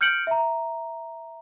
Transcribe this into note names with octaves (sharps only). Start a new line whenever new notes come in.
F6 G6 C#7 D7 F#7
E5 A#5